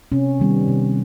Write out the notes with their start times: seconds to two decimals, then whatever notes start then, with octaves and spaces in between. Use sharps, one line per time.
0.12 C3 C#4
0.40 D#3 G3 B3
0.68 C3